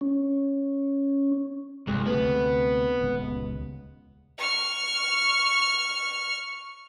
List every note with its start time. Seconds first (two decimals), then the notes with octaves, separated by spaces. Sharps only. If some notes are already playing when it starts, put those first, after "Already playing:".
0.01 C#4
1.87 G1 C2 G#3
2.06 D2 C3 A3 B3
2.99 D#1 C#2
4.38 C#6 F6